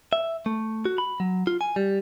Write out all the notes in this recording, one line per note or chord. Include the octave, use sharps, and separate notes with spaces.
E5
A3
F#4
B5
F#3
F4
G#5
G3